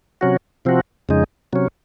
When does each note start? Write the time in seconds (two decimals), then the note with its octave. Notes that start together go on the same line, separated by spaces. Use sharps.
0.21 C3 F#3 C#4 F#4
0.65 C3 F3 C4 F#4
1.09 F2 C#3 G#3 D#4
1.53 C3 F#3 C#4